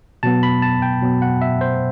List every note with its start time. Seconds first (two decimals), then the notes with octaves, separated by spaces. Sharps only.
0.23 B2 F#3 B3 A5
0.43 B5
0.62 A5
0.82 G5
1.02 B2 F#3 B3
1.22 F#5
1.42 E5
1.61 C5